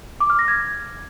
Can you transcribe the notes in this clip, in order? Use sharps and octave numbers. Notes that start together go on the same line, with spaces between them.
D6
F6
A#6
G#6